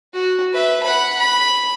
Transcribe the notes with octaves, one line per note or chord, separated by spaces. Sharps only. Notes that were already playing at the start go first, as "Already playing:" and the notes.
F#4
B4 E5
F#5 B5
B5